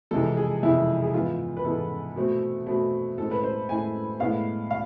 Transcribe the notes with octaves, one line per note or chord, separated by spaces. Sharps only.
F2 C3 E3 G#3 A4
G#4
F2 C3 E3 G#3 E4
G#4
G#2 E3 G#3 B3 F4
B4
G#2 E3 G#3 B3 A4
B2 A3 C4
B2 A3 C4
A2 G#3 C4 A4
B4
C5
A2 G#3 C4 G#5
A2 G#3 B3 F5
F5